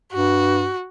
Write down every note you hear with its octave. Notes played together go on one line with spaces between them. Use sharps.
G2 F#4